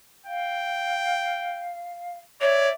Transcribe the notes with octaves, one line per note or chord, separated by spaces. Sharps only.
F5 G5
C#5 D5 E5